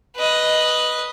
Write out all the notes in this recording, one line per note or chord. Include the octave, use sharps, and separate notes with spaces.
B4 D#5